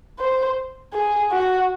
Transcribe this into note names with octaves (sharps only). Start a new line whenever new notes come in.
C5
G#4
F#4